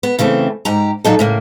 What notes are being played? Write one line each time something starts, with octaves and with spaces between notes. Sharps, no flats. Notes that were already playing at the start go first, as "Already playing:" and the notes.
B3
C#3 E3 A3 C4
G#2 G4 A#5
A#2 F#3 D#4 A4
A2 C#3 A#3